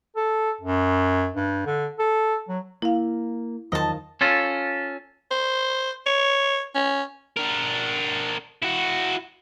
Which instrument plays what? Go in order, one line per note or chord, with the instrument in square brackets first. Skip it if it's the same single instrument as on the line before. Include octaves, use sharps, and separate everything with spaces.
[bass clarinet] A4
F#2
G2
D3
A4
F#3
[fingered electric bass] A#3 [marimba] E4 F5
[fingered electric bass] E2 F#3 [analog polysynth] D#3 F3 [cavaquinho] D#5 A5
[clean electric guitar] C#4 F4 A4
[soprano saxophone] C5
C#5
C#4
[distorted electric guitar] D4 A#4
E4 F#4